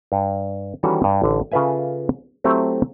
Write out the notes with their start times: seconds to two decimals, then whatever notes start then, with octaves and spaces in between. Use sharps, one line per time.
0.12 G2
0.83 D#3 E3 G3 C#4 F#4 A4
1.04 G2
1.22 A1 D3
1.52 C#3 F4 A4 B4 E5 G#5
2.44 F#3 A3 C4 E4 G4 E5